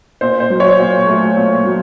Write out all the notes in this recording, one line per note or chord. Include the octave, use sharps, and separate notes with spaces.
A#2 C5
C5
F#3
C#5
A#2
A3
A#2
F#3